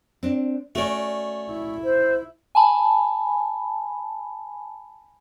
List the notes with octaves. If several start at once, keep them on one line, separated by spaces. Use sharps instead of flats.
C4 D4
A3 C#4 F#4 D5
E4
C5
G#5 A5 B5